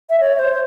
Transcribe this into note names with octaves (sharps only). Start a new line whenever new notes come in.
E5
C#5
C5